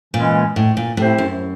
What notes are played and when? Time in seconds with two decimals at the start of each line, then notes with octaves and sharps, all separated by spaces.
0.14 A#2 E3 G#3 C#4
0.56 A2
0.77 A#2
0.97 A2 A3 C4 E4 G4 C5
1.18 F#2